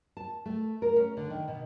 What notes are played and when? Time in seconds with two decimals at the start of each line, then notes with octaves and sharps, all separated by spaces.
0.17 A5
0.46 A3
0.82 A#4
0.96 C#4
1.17 D3
1.30 D#3
1.48 B2